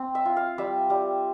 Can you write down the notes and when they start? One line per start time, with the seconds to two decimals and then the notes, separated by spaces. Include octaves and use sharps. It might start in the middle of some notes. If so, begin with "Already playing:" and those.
Already playing: C4
0.15 E5
0.25 F4
0.37 F5
0.58 G3 E5
0.90 G3